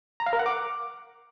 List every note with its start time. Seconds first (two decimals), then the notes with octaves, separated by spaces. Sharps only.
0.20 A#5
0.26 F5
0.33 A#4
0.39 F#5
0.46 D6